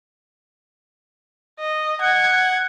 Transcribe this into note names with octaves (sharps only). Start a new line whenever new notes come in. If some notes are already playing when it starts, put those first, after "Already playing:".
D#5
F#5 G#6